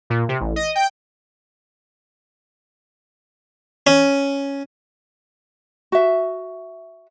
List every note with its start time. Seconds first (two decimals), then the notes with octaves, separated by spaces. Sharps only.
0.10 A#2
0.29 C3
0.40 A1
0.56 D#5
0.75 G5
3.87 C#4
5.92 F#4 E5